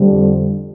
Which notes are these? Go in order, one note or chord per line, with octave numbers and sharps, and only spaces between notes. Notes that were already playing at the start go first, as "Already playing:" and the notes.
Already playing: F2 D3 G3